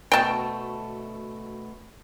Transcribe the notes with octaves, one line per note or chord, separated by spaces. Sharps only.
D2 B2 A3 G5 A5